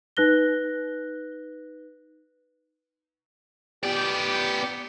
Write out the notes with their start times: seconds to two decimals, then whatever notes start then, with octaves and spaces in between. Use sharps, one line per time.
0.17 D#4 B4 F#6 A#6 G7
3.84 B3 G4 D5